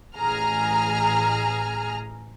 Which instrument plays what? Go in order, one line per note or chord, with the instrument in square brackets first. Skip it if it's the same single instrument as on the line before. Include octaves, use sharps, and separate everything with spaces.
[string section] A1 G#4 A#5 F6